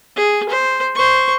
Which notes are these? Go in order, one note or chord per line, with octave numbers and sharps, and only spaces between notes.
G#4
C5
C5 C#6